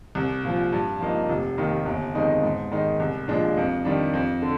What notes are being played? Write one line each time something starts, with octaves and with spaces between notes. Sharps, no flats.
C2
A#2 F3
G2
F3 A#3 D#4
F1
D#2 D#3 A#3
G1
F2 D#3 G#3 D#4
G#2
D#3 G#3 D#4
C2
A#2 F3 G#3 D4
F2
D#3 G3 D4
F2
D3